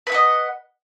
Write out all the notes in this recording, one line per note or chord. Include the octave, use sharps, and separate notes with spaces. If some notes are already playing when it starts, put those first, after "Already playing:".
B4 D#5 E5 F#5